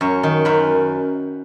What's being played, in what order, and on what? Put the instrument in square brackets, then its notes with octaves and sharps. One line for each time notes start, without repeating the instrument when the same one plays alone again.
[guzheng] F#2 C#5
D#3
F#2 B4